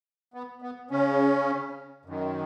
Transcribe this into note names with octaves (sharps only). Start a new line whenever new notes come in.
B3
B3
C#3 C#4
F#2 D#3